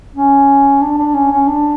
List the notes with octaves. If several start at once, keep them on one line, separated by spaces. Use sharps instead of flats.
C#4
D4
D4
C#4
C#4
D4